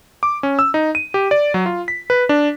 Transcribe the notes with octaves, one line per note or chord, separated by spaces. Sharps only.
D6
C#4
E6
D#4
D#7
G4
D5
F#3
F4
B6
B4
D4